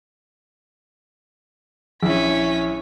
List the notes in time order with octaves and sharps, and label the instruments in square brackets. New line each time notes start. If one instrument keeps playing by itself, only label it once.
[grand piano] A#1 E4 [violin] C#4 B6